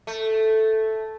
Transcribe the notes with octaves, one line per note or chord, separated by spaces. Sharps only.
A3